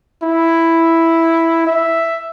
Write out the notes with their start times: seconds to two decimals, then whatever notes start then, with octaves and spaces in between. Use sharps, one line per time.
0.23 E4
1.67 E5